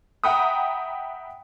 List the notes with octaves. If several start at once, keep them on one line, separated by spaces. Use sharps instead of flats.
E5 F#5 G5 A#5 B5 D#6